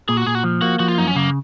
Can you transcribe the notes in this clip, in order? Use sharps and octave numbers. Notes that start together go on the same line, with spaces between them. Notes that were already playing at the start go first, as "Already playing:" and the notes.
A#2 G#4
F#4
A#2 G#4
F#4
F3
A#3 F#4
F3 F#4
F4
F#2 D#4
C#4
C#3 A#3